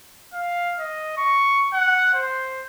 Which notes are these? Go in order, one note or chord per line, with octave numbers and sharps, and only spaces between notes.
F5
D#5
C#6
F#5
C5